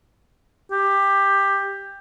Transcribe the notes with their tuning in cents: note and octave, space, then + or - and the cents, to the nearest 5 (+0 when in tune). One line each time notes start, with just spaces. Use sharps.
G4 +15